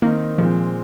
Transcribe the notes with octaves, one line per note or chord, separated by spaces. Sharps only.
D#3 A#3 C4 D#4
A#2 F3 G#3 C4